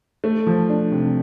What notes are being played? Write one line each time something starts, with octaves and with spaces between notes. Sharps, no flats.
A3
F3
D4
C3